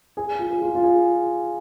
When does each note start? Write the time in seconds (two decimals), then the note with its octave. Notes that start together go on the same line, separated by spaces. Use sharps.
0.17 G#4
0.39 F4
0.51 G#4
0.62 F4
0.75 F4
0.83 G#4